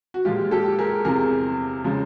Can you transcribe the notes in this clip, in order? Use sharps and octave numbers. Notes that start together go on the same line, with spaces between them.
F#4
A#2 F3 G#3 F4 G4
G4 A4
G#4 A#4
E2 C3 F3 G#4 A#4
C#3 F3 G#3